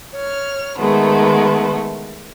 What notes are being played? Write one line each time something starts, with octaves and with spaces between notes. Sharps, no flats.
C#5 F6
D#3 G#3 A3 B3